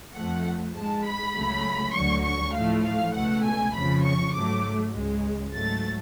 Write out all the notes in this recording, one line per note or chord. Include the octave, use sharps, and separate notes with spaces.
F2 F3 A3 F#5
G#2 G#3 A5
B5
C#2 C#3 F#3 A3
D2 D3 F#3 C#6
C#6
A2 F3 A3 F5
F5
C#2 B2 A3 F#5
G#5
F2 C#3 F3 B5
C#6
G#2 F#3 A3 D6
C#2 C#3 G#3
G#2 F#3 A3 A6